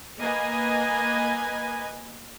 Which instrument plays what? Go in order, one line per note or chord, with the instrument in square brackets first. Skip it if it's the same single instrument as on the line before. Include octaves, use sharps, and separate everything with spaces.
[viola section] A#3 B4 D#5 G#5